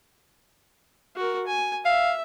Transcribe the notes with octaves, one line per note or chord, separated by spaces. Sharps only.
F#4 A#4
G#5
E5 F5